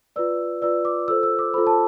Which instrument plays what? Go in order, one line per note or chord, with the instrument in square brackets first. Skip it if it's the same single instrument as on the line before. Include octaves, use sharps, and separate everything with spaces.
[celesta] F4 B4 D5 E6
F4 B4 D5 E6
D6
F4 A4 C5 E6
E6
D6
F4 A4 C5 B5
A5